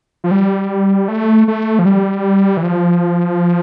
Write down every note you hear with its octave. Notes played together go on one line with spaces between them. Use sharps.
F3
G3
A3
A3
F3
G3
E3
F3